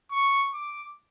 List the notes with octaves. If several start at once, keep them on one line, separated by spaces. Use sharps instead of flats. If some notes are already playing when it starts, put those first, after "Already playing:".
C#6
D6